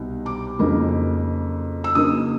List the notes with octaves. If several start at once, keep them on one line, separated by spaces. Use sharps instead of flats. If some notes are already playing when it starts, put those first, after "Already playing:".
Already playing: C2 B2 G3 D#4
D6
F2 C#3 F#3 A#3 D#4
E6
C#3 F#3 A#3 D#4 D#6